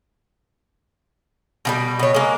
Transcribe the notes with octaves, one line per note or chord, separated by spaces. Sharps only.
B2 F3 G3
B2 C#5
G#3 A#3